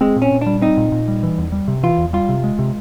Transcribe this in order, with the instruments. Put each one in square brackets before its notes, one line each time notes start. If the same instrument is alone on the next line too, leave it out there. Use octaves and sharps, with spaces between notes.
[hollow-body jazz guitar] G#3 [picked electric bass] C4
[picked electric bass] A#2
[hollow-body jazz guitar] C#4
[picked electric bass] A#2
[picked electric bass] G3 [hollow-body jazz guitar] D4
[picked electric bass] C4 [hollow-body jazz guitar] D#4
[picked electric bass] A#2
A#2
G3
E3
E2
G3
C3
[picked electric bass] E3 [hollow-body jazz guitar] F4
[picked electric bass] E2
[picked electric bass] G3 [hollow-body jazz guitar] F4
[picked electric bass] C3
G#3
C3